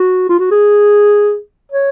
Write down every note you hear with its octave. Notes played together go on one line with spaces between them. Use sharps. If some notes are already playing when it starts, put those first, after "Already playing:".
Already playing: F#4
F4
F#4
G#4
C#5